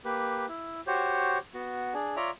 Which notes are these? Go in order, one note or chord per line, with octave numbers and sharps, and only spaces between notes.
A#3 G4 B4
E4
F#4 G4 C5 C#5
B3 F#4
D4 G#4
F4 C#5 D5 E5 A#5